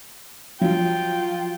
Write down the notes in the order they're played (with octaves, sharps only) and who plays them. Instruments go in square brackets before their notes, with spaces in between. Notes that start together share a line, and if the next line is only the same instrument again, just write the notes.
[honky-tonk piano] F3 F#3 [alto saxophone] F4 [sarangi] G5